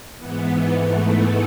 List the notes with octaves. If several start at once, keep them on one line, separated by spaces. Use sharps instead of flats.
G#2 E3 B3
G#2 E3 A3
B3